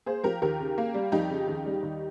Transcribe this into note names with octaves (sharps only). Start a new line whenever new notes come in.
A#3 G#4 C5
F3 G4 A#4
D#2 G4 A#4
C#3
A#3
G3
F2 D#4 G4
C#3
D#2
G3
D#2